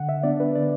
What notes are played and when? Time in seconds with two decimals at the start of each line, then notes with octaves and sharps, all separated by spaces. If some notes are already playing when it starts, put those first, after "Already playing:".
Already playing: D3 F#5
0.09 E5
0.23 B3 D4 D5
0.40 B4
0.55 D3 D5